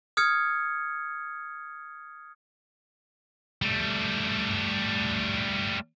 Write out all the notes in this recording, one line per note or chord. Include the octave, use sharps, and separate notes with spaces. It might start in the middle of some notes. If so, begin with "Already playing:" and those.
D#6 F6 G#6 C#7
G3 A3